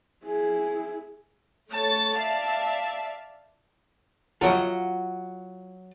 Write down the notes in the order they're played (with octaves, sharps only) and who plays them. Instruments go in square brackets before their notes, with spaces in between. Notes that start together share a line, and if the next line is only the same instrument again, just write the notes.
[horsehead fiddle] E4 G#4
[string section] A3 C#5 A6 [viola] A5
[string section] D5 E5 F5
[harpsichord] A#1 C#5 G5 [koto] F#3 D#5 [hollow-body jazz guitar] F4 E5